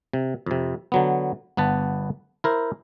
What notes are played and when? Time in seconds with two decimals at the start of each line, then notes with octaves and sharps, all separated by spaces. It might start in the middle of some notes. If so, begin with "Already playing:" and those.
0.13 C3
0.46 F2 C3
0.92 D3 F#3 B3
1.57 G1 B3 B4 A5
2.44 E4 A#4 C5